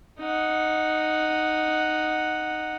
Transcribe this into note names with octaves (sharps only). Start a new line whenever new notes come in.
D#4 F#5